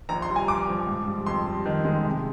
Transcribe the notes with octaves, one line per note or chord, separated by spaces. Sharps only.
A#1 A#5
C6
G3
G#5
G2 D6
F3
G#2
G3
F2 C6
G3
D#3
G#3
C3